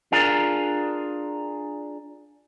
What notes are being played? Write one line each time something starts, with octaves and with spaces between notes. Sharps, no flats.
D4 F4 G#4 A#4